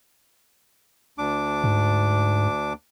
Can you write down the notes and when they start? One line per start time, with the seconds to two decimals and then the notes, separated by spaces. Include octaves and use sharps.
1.18 D2 D4 D6
1.64 G#2